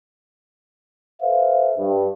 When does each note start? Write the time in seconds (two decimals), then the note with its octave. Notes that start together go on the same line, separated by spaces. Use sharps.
1.22 A4 B4 C5 E5 F5
1.78 G2